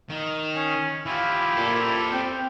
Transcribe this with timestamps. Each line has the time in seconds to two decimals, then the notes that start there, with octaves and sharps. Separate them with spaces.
0.10 D#3
0.56 C#4
1.06 E3 E4 F4 G4
1.56 A#2 A4 C5
2.12 C4 G5